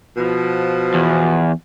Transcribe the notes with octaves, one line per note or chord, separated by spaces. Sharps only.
B2 F3
E2